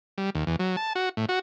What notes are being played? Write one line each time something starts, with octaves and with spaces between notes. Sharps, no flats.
G3
D#2
E2
F#3
A5
F#4
A2
F#4